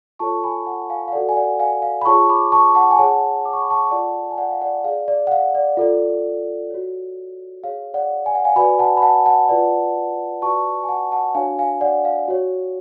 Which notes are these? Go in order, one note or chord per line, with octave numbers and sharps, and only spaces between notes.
F4 A4 C#5 A5 C#6
G#5 B5
F#5 A5
F5 G#5
F5
F#4 A4 D5 F#5
G#5
D5 F#5
F5 G#5
F5
B5
F4 G#4 C#5 A5 C#6
B5 D6
A5 C#6
F#5 A5
G#5
G#4 C#5 F#5 A5
D6
C#6
B5
A5 C#6
F4 A4 D5 F#5 A5
G#5
D5 F#5
F5
D5 F#5
G#4 D5 F5
D5
F#5
F5
D5
F4 A4 D5
F#4 C#5
G#4 C#5 F5
D5 F#5
G#5
F#5
F5 G#5
F#4 B4 D5 G#5 B5
F#5 A5
B5
F#5 A5
F#5 A5
F4 B4 D5
F#4 B4 D5 A5 C#6
G#5
F#5 A5
F#5 A5
D4 F#4 C#5 F5 G#5
F5 G#5
D5 F#5
F5
F#4 C#5